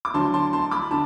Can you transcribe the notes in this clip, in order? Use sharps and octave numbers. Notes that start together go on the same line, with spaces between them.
D6
D2 D3 F#3 A5 C6
A5 C6
A5 C6
B5 D6
D3 A5